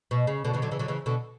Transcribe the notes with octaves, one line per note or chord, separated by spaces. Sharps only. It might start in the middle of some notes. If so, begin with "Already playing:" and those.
B2
C#3
B2 D3
C#3 E3
D3 F#3
C#3 E3
D3 F#3
C#3 E3
B2 D3